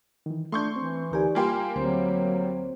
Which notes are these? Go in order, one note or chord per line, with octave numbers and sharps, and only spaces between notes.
D#3 E3
A3 D4 C6 C#6 G6
E3 C4
D2 D#4 G4 A#4 D5 G#5
G3 A#3 F4 G4 G#5 C6
D2 F#3 C4 C5